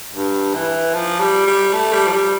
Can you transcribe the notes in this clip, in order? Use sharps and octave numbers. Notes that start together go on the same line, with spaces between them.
G2
E3
F3
G3
G3
A3
G3
F3
G3